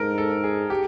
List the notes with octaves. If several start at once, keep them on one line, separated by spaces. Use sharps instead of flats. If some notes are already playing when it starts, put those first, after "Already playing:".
Already playing: G#2 A4 A#4
A4
G#4
G4